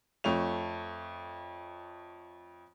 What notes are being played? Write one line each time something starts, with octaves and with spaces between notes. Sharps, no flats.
F2 A3 C#5 F7